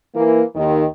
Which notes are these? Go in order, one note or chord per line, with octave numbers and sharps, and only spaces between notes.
E3 A#3
D#2 D#3